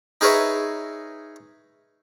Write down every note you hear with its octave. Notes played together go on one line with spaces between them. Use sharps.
D#4 G#4 A#4 B4 C#5 E5